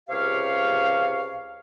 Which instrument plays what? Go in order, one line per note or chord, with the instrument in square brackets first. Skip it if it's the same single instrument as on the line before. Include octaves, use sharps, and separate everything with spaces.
[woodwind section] C#2 C3 G4 C#5 F5